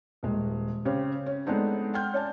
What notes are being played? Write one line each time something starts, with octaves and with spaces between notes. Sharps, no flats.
D#1 G#3
C#3 C4 C#4 G4 C5 C#5
C#4
G#3 A3 B3 C4 D4 D#4
F#5 G5 C6 F6 G6
C#4 C#5 D5 G#5 A5